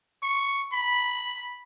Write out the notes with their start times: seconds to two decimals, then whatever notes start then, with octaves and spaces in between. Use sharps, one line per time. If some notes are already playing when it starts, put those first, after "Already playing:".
0.23 C#6
0.73 B5